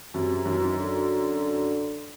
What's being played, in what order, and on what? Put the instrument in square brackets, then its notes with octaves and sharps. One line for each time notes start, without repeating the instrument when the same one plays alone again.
[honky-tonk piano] F#2 [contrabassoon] C3
[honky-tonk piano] F#2 [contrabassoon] D#3
[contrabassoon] E3
D#3
D3